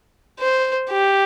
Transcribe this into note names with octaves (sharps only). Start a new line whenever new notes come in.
C5
G4